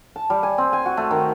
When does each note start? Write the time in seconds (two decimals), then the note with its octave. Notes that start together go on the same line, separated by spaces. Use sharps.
0.16 A5
0.30 G3
0.43 G#5
0.58 C4
0.73 G#5
0.86 F#4
0.97 A3
1.11 D#3